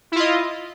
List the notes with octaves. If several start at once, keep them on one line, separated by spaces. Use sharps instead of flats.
E4 F4 D#5